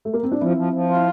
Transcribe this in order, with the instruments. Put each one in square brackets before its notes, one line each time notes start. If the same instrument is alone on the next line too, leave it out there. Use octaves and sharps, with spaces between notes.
[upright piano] A3
A#3
C4
D4
[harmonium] F3 [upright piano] C4 E4
[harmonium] F3
F3
F4
[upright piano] E4